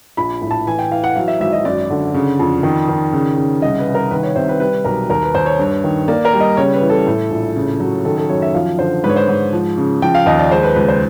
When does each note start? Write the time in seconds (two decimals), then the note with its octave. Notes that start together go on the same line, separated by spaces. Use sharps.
0.17 A#1 B5
0.42 A2
0.51 A5
0.66 E3 G#5
0.79 G5
0.91 E3 F5
1.04 F#5
1.16 F#3 F5
1.28 E5
1.40 G#1 E5
1.53 D#5
1.65 F#2 D5
1.90 D3
2.14 C#3
2.39 F2
2.63 D#3
2.88 D#3
3.13 C#3
3.37 C#3
3.62 C2 D#5
3.79 B4
3.87 C2
3.95 A#4
4.11 D#3 B4
4.23 C#5
4.36 C3 C5
4.49 B4
4.60 G3 B4
4.85 B1 A#4
5.10 D#2 A#4
5.23 B4
5.35 D#2 C5
5.46 C#5
5.59 G2
5.84 D#3
6.08 A#3 D5
6.25 A#4
6.33 G3
6.40 D#5
6.57 C#3 C#5
6.73 B4
6.81 E3
6.90 A4
7.07 A2
7.31 A#1
7.56 C#3
7.80 F#3
8.05 D#3 A4
8.17 A4
8.29 F#2 C#5
8.42 E5
8.55 F3 F5
8.79 D3 C5
9.04 G#2 B4
9.10 C#5
9.16 C5
9.28 G#2
9.53 F3
9.78 C#3
10.02 F3 G5
10.15 F5
10.26 D#2 D#5
10.39 D5
10.51 G#3 C5
10.63 B4
10.76 C#2 B4
10.88 C5